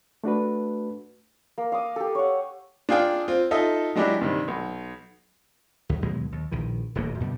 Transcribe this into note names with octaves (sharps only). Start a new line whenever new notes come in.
A3 D4 F#4 B4
A#3
F5 D6 D#6
G4 A4
C#5 F#5
D4 F4 G#4 F5 G5
C4 F4
D#4 F4 A4 D#5 E5
F#3 G#3 D4 E4 G4
G2 C3 D#3
B1
D2 F#3
D#2 B2 F#3 G#3
D#2
A#1 D#3 E3
D#1 A1 B2 A#3
F#2 B2 D3 G3